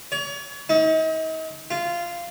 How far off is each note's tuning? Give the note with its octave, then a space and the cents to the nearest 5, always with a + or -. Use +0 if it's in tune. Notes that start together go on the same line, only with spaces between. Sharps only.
C#5 +35
D#4 +40
F4 -15